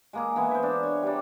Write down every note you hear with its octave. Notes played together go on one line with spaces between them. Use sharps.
G#3 A#3 G#4
E3 B3 E4
C5 E5
D4
C#5
G3 D4